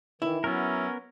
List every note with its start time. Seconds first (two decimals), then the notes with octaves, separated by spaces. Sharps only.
0.22 D#3 E3 E4
0.44 F#3 B3 C#4 A#4 E5